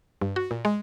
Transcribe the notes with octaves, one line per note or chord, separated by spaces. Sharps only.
G2
F#4
A#2
G#3